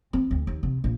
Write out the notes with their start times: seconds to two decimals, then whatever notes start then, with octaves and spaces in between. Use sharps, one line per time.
0.13 C4
0.31 D2
0.47 D#2
0.63 C3
0.84 A#1